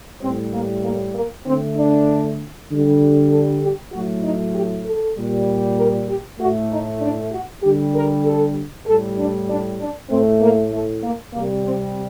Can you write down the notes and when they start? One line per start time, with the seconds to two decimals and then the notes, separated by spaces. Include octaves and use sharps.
0.22 A2 G3 C4
0.53 A#3
0.84 A#3
1.15 A#3
1.46 D3 A3 C4
1.77 D4
2.70 D3 G3
3.31 A4
3.62 G4
3.93 A2 F#3 A3 F#4
4.24 D#4
4.55 G4
4.86 A4
5.17 A#2 G3
5.78 A#4
6.09 G4
6.40 A2 A3 F#4
6.71 D#4
7.01 D4
7.33 F#4
7.63 D3 G3 G4
7.95 A#4
8.25 A4
8.87 A2 G3 A4
9.18 D4
9.49 D4
9.80 D4
10.10 A2 A3 C4
10.41 A#3
10.72 A3
11.03 A#3
11.34 C3 G3 A#3
11.65 C4